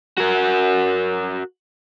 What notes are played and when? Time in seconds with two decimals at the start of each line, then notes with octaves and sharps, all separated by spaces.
0.18 F#4 A#4